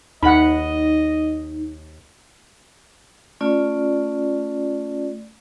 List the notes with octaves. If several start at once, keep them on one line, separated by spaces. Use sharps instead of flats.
D#2 D#4 D#5 F#5 B5
A3 C#4 F4 D5